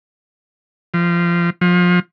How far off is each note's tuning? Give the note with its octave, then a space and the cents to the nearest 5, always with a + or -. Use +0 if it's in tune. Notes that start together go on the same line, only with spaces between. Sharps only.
F3 -20
F3 +30